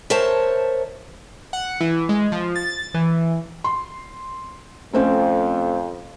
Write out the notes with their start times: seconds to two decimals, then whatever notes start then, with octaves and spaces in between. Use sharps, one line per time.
0.10 A#4 C5 C#5 E5 A5
1.53 F#5
1.80 E3
2.09 G#3
2.32 F3
2.56 A6
2.94 E3
3.64 C6
4.93 F2 A3 C4 C#4